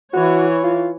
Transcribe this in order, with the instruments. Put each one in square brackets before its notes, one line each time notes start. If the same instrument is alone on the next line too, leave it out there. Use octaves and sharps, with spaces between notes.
[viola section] E3 C#5 [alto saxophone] F#4
[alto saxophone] F4